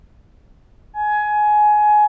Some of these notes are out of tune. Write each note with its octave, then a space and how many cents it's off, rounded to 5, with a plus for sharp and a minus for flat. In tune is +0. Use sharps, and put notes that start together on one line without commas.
G#5 +20